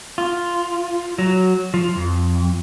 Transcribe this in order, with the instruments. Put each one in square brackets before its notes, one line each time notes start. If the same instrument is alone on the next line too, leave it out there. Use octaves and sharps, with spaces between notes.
[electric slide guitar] F4
F#3
F3
F2